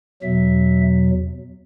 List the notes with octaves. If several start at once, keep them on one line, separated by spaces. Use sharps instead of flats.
E2 B2 F#3 E5